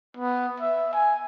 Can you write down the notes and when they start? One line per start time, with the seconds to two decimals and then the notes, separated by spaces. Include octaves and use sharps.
0.17 B3
0.60 E5
0.93 G#5